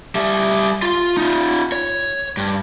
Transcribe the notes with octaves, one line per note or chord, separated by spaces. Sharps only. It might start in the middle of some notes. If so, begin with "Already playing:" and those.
G3 E5
F4 C6
D#4 F4
C#5
G2